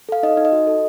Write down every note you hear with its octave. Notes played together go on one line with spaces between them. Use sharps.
A4 F5
D#4 D#5
D#4
D#5
F#4
A4